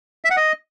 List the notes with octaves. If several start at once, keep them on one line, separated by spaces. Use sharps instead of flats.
E5
F#5
D#5